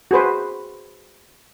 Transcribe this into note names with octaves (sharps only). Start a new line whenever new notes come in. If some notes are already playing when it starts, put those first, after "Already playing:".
F#4 G#4 B4 C5